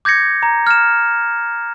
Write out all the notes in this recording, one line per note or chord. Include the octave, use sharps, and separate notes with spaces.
D6 G6 G#6 A#6 C#7
A#5
F6 E7